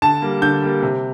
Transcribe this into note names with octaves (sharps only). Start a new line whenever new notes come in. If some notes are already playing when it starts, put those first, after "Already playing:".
D3 A5
G3 A#3
D3 G6
G3 A#3
C3